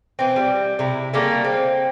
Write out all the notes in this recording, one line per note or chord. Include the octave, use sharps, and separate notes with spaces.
E3 C4
G3
C3 E4
C#3 G3 A3 A#3
C4